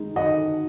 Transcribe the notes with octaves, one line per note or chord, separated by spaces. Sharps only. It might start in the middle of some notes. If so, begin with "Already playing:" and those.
Already playing: D#3 G#3 D#4
D#3 D#5 F#5